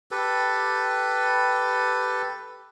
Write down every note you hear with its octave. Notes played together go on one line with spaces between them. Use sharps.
G4 A4 B4